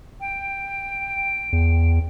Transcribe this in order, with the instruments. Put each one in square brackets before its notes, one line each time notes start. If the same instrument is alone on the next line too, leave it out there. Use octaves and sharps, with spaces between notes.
[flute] G5
[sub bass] E2